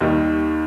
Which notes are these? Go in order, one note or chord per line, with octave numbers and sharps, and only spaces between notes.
D#2 D#3 G3